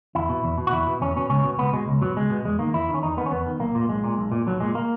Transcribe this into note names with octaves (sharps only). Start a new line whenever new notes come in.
E2 E4
B2
E2
B2
F#4
E2 E4
B2
E2 C#4
B2 C#4
C#2 C#4
B2
C#2 B3
B2 G#3
C#2
B2 F#3
C#2 G#3
B2
E2 G#3
D#3 A#3
E2 E4
D#3
C#4
E2 D#4
D#3 B3
C#4
E2 B3
D#3
B1 A#3
A#2
A#3
B1 G#3
A#2
B1
A#2
B1 F#3
A#2 G#3
A#3